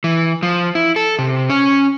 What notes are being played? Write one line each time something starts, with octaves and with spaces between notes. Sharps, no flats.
E3
F3
E4
A4
C3
C#4